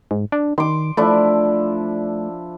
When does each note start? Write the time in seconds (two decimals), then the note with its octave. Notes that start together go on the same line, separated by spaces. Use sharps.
0.11 G#2
0.32 D4
0.58 D#3 C6 D6
0.97 F3 A3 D4 E4